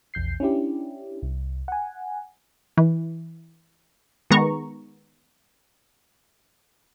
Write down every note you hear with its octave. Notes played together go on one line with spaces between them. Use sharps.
A#1 E2 G6 C7
C#4 D4 E4 G4
C2
F#5 G#5
E3
D#3 G#3 B3 A#5 C#6